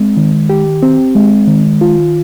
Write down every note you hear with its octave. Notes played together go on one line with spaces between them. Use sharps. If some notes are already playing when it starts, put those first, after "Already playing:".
Already playing: G#3 C4
D#3
G4
C4
G#3
D#3
F4